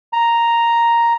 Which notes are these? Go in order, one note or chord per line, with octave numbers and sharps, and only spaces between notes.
A#5